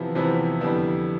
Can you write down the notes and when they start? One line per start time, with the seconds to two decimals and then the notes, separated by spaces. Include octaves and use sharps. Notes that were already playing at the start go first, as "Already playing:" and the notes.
Already playing: E2 C3 F3 B3 E4
0.15 E2 C3 F3 B3 E4
0.61 F2 D3 G3 B3 E4